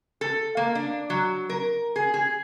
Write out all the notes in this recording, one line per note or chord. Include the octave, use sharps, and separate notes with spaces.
A4
A#3
D4
F#3
A#4
G#4
G#4